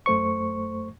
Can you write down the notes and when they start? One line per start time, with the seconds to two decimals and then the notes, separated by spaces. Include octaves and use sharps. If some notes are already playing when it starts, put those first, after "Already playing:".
0.06 F#2 A3 C5 C#6